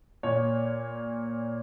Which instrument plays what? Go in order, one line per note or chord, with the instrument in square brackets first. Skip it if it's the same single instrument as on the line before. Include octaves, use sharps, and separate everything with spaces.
[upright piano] A#2 C#5